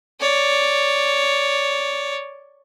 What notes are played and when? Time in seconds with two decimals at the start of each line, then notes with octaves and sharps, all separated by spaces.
0.21 C#5 D5